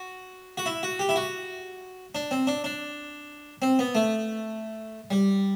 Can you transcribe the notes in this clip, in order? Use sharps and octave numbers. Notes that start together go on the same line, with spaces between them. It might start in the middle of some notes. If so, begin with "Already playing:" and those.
Already playing: F#4
F#4
E4
F#4
G4
E4
F#4
D4
C4
D4
D4
C4
B3
A3
G3